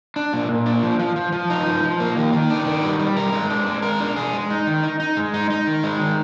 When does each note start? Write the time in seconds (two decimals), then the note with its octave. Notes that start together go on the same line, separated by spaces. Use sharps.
0.16 D4
0.33 A#2
0.49 A#2
0.66 D4
0.83 F3
0.99 F3
1.16 F3
1.32 F3
1.50 D#4
1.66 F3
1.83 F3
2.00 A#3
2.16 D#3
2.33 D#3
2.50 D4
2.66 D#3
2.83 G3
2.99 G3
3.16 A#4
3.32 G#3
3.50 D4
3.67 G#3
3.82 A#4
4.00 D4
4.16 G#4
4.33 G#3
4.50 D#4
4.67 D#3
4.83 D#4
5.00 D#4
5.17 G#3
5.34 D#4
5.50 D#4
5.67 D#3
5.84 G#3
6.00 D#3